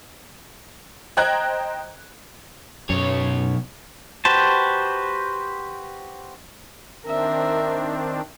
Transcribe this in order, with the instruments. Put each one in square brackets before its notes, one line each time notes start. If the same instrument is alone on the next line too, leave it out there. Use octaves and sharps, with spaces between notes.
[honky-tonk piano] C5 D#5 G5 A#5 F#6 G#6
[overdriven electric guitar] B1 C#5 [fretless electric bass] F#2
[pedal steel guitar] F#4 G4 B4 C5 A5
[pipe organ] D#3 C4 D4 [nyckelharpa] A#4 E5